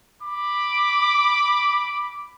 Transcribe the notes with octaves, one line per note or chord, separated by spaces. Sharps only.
B5 D6